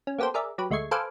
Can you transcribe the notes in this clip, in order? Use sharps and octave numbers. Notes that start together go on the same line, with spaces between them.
C#4
A#3 B3 G4 A4 C5
G#4 A#4 D5 E5
F#3 G4 B4
D2 G#3 A3 C#6 G#6 C7
A4 B4 C5 F5 G#5 D6